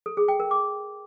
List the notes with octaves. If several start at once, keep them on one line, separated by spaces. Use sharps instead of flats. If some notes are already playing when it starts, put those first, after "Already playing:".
A4
G#4
G5
A#4
D6